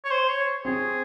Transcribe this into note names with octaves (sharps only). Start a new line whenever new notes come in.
C#5
C5
C#5
C4 G#4